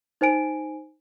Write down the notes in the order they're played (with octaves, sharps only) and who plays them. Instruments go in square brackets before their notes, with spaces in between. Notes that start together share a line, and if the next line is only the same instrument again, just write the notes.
[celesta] D#4 C5 G#5 D7